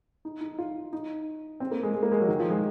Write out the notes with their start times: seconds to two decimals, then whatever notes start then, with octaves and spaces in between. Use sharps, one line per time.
0.25 D#4
0.41 D#4
0.58 F4
0.93 D#4
1.60 C4
1.71 A#3
1.83 G#3
1.94 G#3
2.03 A#3
2.12 G#3
2.20 F#3
2.28 D#3
2.40 F3
2.50 G#3